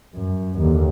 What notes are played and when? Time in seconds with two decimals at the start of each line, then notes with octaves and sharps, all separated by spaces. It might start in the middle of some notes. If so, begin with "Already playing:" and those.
0.15 F#2
0.59 D#2 D3